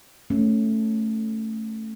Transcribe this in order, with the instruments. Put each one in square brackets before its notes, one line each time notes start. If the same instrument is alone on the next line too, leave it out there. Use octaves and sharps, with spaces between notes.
[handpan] A3 C#4